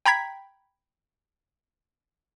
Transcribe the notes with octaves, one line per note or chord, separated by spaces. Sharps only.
G5 A#5 B5 G#6 B6